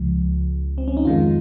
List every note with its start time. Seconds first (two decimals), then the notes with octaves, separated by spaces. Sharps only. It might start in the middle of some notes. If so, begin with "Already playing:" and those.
Already playing: C#2 C#3 F3 G#3
0.78 C4
0.88 C#4
0.97 D#4
1.05 F2 D#3 G#3 F4